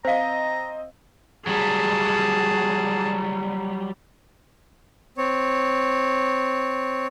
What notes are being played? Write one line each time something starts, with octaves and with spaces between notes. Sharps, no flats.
C4 C5 D#5 F5 A#5
F#3 G3 G#4 A5
C4 C#5